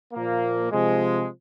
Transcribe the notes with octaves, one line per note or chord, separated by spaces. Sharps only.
A#2 F3 A#3
C3 F3 G#3